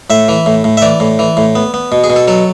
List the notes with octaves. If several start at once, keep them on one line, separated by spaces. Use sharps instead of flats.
A2 E5
E3
A2
A2
E5
E3 D5
A2
E3
A2
B3
B3
B2
G#4
B2
A4
F#3 A4